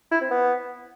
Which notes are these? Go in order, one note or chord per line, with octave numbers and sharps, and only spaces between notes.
E4
C4
B3